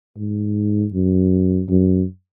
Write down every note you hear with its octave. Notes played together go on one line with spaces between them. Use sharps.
G#2
F#2
F#2